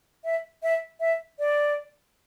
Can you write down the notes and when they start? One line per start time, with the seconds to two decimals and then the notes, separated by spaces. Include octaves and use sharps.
0.25 E5
0.63 E5
1.00 E5
1.39 D5